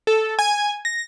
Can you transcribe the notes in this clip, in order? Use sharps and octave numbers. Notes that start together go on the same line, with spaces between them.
A4
G#5
A#6